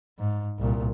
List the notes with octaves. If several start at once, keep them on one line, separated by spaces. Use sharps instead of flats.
G#2
C2 A#2